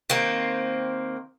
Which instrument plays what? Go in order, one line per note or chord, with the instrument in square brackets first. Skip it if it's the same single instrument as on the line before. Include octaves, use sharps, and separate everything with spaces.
[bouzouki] D#3 A#3 C4